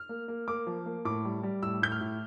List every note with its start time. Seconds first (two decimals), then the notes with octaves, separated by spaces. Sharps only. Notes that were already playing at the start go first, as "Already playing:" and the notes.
Already playing: F6
0.09 A#3
0.28 A#3
0.48 A#3 D6
0.67 F3
0.86 A#3
1.05 A2 D6
1.25 G3
1.43 G3
1.63 A2 E6
1.82 A2 G6
1.92 F6
2.01 A2